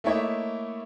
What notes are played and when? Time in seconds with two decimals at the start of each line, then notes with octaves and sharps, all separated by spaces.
0.04 A3 A#3 E4 C#5 D#5